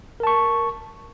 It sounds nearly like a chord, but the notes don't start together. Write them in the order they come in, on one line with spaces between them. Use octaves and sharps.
A#4 A5 C#6